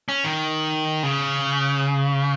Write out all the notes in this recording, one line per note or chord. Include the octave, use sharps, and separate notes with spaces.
C#4
D#3
C#3